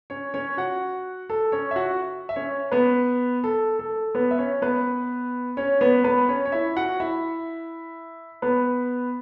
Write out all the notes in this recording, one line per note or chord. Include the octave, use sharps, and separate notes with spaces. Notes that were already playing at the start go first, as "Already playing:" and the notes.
C#4 C#5
C#4 C#5
F#4 F#5
A4
C#4 C#5
E5
F#4 F#5
E5
C#4 C#5
B3 B4
A4
A4
B3 B4
E5
C#4 C#5
B3 B4
C#4 C#5
B3 B4
B3 B4
C#4 C#5
C#5
E4 E5
F#4 F#5
E4 E5
B3 B4